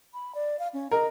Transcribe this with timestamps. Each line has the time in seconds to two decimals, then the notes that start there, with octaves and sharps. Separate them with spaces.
0.14 B5
0.35 D5
0.59 F5
0.74 C#4
0.91 A#4 D#5